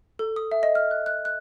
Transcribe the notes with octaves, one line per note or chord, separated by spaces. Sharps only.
A4
D#6
E5
D#5
F6
F#6
F#6
F#6